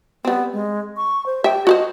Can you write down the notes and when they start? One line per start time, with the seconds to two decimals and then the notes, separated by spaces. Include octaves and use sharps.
0.25 G3 B3 C4
0.53 G#3
0.97 C#6
1.26 C5
1.44 G4 E5 G5
1.67 F#4 B4 C5 D#5